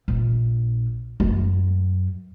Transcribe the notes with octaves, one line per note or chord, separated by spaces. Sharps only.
A#1
F#2